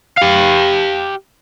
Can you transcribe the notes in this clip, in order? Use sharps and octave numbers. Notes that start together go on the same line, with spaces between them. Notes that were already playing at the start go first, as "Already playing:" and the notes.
G4 F5